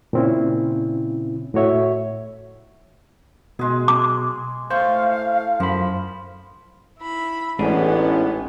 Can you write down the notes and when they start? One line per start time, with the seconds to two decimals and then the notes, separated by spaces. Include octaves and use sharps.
0.13 A#2 C#3 C4 C#4 E4
1.54 A2 F#4 C#5 E5
3.59 B2 G#3 G#4
3.88 D6
4.70 A2 C5 F5 C#6
5.60 F#2 F3 B5
7.00 E4 B5
7.59 A1 G#2 B3 C#4 D4 G#4